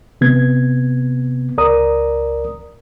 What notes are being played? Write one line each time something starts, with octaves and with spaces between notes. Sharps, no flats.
C3 B3 G#6
C#2 A#4 D5 A#5 D#6